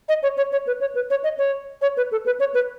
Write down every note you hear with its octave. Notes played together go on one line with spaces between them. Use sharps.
D#5
C#5
C#5
C#5
B4
C#5
B4
C#5
D#5
C#5
C#5
B4
A4
B4
C#5
B4